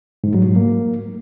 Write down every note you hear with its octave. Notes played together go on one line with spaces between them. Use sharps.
G#2
F#3
G#2
A#3